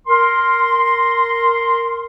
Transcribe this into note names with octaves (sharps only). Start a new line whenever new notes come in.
A#4 C6